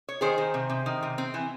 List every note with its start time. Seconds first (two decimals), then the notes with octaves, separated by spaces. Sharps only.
0.09 C#5
0.21 D#3 G#4 C5
0.38 D#3
0.54 C3
0.70 C3
0.86 D#3
1.02 C3
1.18 C4
1.34 E3